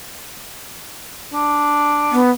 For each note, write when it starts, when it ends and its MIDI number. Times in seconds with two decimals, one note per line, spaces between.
1.33 2.17 62
2.11 2.30 59